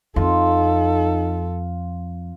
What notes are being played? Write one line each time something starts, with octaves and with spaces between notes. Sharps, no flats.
F2 D#4 F4 A4